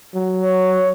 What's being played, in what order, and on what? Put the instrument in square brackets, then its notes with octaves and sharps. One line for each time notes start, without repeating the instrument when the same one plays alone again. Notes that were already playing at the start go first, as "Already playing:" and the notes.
[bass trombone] F#3
[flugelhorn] C#5